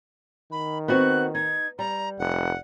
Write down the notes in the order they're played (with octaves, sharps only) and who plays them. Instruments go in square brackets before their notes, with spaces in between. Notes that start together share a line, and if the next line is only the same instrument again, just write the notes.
[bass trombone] D#3 [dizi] B5
[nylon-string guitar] B3 C4 F#4 [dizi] F#6
[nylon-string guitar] D#4 [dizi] G#6
[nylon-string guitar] G3 [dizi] A#5
[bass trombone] F1 [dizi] F#5